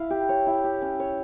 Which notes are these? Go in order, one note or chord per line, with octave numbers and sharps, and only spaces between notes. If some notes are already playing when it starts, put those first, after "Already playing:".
Already playing: E4 F5
G4
C#5
E4
G4
C#4
C#5